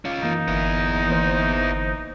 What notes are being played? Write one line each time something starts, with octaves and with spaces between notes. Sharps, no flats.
C#4 F4
F#2 E3 A#3 D#4
G1 B3 E4
E3 A#3 C5